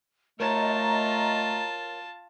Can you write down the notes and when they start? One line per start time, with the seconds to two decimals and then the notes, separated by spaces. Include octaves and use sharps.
0.40 A3 F4 A#4 C#5 D#5 A5 A#5